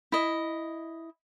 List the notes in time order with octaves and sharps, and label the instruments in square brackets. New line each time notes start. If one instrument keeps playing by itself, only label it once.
[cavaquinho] E4 D#5